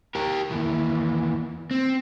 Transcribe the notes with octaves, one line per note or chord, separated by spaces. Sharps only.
G4 A#4
D#2 E3
C4